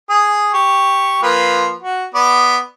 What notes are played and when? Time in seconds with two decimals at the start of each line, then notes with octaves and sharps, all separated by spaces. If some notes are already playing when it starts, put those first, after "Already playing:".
0.10 G#4 D#6
0.54 G4 C#6
1.23 F3 A#3 B4
1.82 F#4
2.15 B3 D5